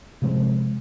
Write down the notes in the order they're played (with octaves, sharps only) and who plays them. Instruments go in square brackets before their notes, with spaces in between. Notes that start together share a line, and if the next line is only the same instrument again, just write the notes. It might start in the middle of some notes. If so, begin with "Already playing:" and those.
[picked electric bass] C3 F3 G#3 C4